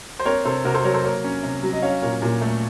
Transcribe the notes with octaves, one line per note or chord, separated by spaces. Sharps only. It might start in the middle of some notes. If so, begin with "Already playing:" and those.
C5
C4 A#4 C#5
C3 A4 C5
C3 F#4 A#4
A4 C5
F#3 A#4 C#5
A4 C5
A#3 A#4 C#5
C#4
C3
F#3
D#5
C#4 C#5 F5
A#2 A#4 C#5
A#2
A3